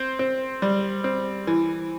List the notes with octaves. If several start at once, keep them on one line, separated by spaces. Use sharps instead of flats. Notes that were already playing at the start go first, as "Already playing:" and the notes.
Already playing: C4 C5
C4
G3
C4
E3